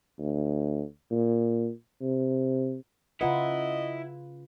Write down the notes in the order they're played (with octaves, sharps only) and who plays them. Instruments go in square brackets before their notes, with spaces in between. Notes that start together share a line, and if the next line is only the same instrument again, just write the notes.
[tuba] D2
A#2
C3
[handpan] C#3 F4 B4 [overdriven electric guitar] E4 [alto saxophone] D#5 [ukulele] F#5 A#5